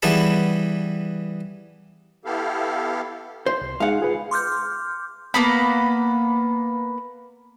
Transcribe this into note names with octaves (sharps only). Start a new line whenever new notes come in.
E3 G3 B3 G#4 A5 B5
B3 E4 G4 A4 F5
C5
C2
G#3 D#4 G#4 F5 F#5
F4 G#4 B4
C6 D6 F6 G6
A#3 B3 B5